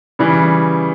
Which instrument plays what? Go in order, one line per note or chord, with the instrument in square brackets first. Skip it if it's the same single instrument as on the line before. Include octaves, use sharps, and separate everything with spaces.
[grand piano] C#3 E3 G3